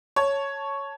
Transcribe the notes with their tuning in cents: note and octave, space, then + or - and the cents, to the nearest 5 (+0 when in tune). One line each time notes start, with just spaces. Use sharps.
C#5 +0 A5 +0